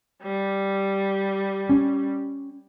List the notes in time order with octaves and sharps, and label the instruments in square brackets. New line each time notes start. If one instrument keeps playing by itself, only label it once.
[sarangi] G3
[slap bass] C#4